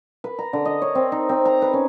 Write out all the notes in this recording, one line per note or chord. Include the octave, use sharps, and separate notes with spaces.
B4
A#5
D3
D#5
C#5
C4
D#4
C4
A#5
B4
C#4